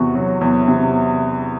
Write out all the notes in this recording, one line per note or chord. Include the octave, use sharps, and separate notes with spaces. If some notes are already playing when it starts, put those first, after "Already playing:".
Already playing: E2 C3 F#4
F#3
E2
C3